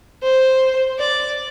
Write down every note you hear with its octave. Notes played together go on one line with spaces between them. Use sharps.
C5
D5